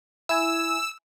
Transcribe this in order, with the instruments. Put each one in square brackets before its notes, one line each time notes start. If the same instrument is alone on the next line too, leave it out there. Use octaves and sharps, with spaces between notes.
[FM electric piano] E4 G#5 [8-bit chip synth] E6